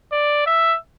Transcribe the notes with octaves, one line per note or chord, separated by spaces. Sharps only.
D5
E5